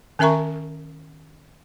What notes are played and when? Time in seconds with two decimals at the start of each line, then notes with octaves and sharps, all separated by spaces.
0.19 D#3 C#4 A#4 E5 A#5 C#6